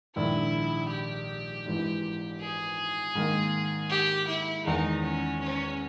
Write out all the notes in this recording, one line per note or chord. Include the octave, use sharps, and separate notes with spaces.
A#1 G#2 D#3 E4
G4
G#1 G#2 E3
G#4
G#2 D#3 A#3
G4
E4
E2 D#3 G#3 D#4
C#4
C#4